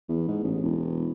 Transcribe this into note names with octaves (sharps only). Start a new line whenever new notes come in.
E2
G#2
A1
E1